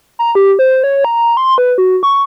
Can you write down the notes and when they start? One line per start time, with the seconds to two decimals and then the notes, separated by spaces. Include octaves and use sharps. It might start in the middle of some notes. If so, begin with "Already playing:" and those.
0.19 A#5
0.35 G4
0.59 C5
0.84 C#5
1.05 A#5
1.37 C6
1.58 B4
1.78 F#4
2.03 C#6